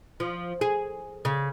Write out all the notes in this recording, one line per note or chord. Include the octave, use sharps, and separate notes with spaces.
F3
G#4
C#3